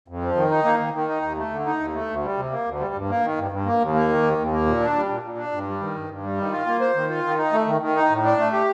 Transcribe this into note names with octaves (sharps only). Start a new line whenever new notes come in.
F2
F3
D#3
D#4
A#3
D#3
D#3
D#4
D#2
A3
D3
D#4
D#2
A3
D2
G3
C3
A#3
D2
G3
G2
A#3
D#3
G2
G2
A#3
D#2
A#3
D#3
D#2
D#2
A#3
A#2
D4
G3
A#2
A#2
D4
G2
G3
D#3
G2
G2
G3
D#3
F4
A#3
C5
D#3
F4
D#3
D#4
A3
D#3
D#3
D#4
A2
D4
A3
G4